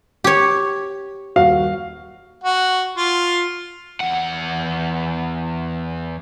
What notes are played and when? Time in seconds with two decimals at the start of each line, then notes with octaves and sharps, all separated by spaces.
0.24 G4 C#5
1.36 D#1 F#4 F5
2.43 F#4
2.97 F4
4.00 E2 F#5